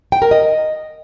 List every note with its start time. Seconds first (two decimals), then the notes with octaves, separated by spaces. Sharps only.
0.12 G5
0.22 A#4
0.31 D#5